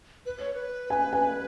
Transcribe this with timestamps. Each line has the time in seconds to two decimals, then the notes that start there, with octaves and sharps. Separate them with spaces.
0.26 B4
0.40 C#5
0.54 B4
0.90 G#5
1.13 G#5